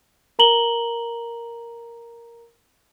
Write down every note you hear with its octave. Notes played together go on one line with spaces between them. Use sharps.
A#4 A#5 F#7 G7